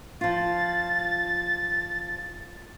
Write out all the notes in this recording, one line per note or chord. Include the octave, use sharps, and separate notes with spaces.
F3 F4 A6